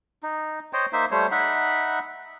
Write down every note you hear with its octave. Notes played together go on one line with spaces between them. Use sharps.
D#4
C5 C#5 D#5 G5
A#3 D#4 C5 E5
G3 A3 C5 C#5
D#4 E5 F#5 B5